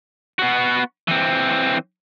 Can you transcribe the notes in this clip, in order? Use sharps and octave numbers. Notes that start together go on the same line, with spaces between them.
B3 F#4
E3 C4